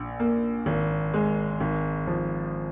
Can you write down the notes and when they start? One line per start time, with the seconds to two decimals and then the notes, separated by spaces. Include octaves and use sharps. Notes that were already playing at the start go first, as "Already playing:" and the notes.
Already playing: A#1
0.20 A#3
0.66 G#1
1.14 G#3
1.61 G#1
2.07 F3